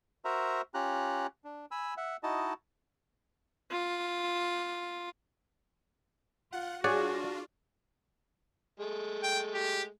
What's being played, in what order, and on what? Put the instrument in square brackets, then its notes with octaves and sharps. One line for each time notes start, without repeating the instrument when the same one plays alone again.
[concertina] F#4 A#4 C5 E5 A#5
C#4 F4 G4 A#5 F#6
D4
G#5 B5 E6
E5 F#5
D#4 E4 F#4 D#5 A5
[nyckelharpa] F4
[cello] F4 [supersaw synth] F#5
[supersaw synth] D4 F4 [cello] F#4 [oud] G#4 [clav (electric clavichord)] C#5 D5 F#5
[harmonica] G#3 A3
[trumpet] G5
G4